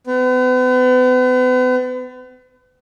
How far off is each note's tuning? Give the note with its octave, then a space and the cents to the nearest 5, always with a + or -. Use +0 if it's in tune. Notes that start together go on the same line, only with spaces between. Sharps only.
B3 +40